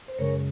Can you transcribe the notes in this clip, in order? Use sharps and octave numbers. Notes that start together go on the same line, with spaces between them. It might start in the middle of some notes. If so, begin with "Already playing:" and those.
C5
F#2 C#3 G#3 A#4 C#5